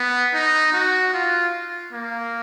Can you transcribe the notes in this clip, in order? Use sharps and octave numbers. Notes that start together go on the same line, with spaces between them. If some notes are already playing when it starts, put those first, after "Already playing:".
Already playing: B3
D#4
F#4
F4
A#3